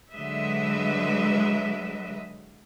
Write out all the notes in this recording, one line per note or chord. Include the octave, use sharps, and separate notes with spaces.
D3 F#3 G#3 B4 D#5 E5